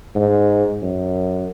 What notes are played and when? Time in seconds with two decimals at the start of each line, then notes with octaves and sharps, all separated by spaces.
0.15 G#2
0.82 F#2